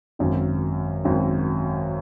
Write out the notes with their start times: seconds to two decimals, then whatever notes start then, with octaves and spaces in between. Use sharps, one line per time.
0.19 G#1 F#2 D#3
1.04 G#1 F#2 D#3